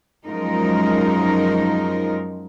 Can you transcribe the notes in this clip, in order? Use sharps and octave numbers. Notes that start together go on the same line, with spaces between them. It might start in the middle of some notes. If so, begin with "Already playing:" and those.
F#2 F3 G#3 D#4 A#4